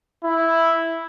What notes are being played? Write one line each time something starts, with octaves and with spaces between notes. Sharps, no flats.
E4